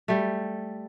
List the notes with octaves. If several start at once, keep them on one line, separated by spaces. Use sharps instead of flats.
G3 A3